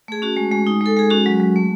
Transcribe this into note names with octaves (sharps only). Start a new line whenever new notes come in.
A3 G#4
C#4 F#4
G#3
G#3
D#4
G#3 A4
G#3 G#4
C#4 F#4
F#3
F#3
A3